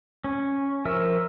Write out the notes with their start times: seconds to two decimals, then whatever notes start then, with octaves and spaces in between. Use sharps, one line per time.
0.24 C#4
0.85 F3 A#4 E5 E6